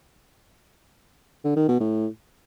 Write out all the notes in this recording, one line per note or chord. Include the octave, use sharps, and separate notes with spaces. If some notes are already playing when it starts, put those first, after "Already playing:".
D3
D#3
B2
A2